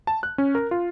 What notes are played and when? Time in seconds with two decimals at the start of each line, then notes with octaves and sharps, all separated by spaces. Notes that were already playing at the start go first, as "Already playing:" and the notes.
0.07 A5
0.23 F#6
0.38 C#4
0.55 A#4
0.71 F4